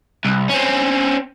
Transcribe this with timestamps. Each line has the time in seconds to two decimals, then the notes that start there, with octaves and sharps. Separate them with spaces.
0.25 C2
0.49 C4 C#4